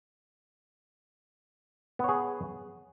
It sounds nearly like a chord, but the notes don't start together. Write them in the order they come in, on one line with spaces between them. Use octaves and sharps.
B3 C#5 G#4